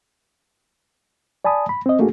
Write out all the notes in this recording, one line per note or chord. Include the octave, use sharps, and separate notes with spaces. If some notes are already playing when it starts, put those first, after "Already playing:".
D5 G#5 A5 B5 D#6
B5
C4 D#5
A3 A#3 D4 F#4 G#4